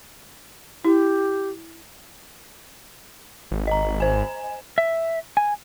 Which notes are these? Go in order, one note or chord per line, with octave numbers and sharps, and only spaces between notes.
E4 G4
G#1
D#5 A#5
C5 G#5
E5
G#5